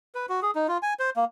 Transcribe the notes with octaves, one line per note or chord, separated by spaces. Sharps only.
B4
F#4
G#4
D#4
F4
G#5
C5
A#3